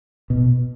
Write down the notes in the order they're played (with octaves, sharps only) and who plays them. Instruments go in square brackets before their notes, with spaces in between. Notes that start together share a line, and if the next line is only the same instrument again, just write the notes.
[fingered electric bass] B2